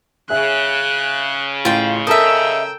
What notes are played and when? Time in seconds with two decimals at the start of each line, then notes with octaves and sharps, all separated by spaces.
0.30 C#3 G#4 E5 F#6
1.65 A1 F4 G5
2.07 A4 A#4 D#5 E5 G5 A5 E6